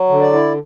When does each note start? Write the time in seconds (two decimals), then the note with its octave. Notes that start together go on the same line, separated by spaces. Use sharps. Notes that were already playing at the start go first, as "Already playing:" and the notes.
Already playing: F#3
0.09 D3
0.21 D5
0.33 E4